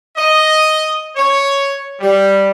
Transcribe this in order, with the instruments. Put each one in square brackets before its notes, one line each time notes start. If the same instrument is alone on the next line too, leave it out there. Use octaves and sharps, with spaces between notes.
[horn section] D#5
C#5
G3